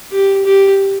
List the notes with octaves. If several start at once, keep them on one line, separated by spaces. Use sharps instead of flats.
G4
G4